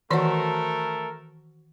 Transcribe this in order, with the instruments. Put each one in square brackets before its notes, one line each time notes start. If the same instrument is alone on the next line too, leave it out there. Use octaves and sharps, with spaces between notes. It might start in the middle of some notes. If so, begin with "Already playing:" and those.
[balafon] D#3 E3 D5 [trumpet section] A3 A4 A#4 [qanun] F#4 C5